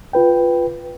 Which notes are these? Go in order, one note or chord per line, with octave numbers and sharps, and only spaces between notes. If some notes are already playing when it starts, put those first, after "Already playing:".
F4 B4 G5